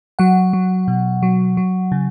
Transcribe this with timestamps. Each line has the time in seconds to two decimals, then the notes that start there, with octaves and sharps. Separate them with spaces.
0.19 F#3 F#5
0.53 F#3
0.88 B2
1.23 F#3
1.57 F#3
1.92 C#3